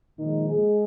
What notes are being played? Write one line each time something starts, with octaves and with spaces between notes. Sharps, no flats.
A#2 D#3 F3 G#3 D#4
G#3 G#4